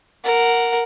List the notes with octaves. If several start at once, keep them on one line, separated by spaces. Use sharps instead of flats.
A#4 F#5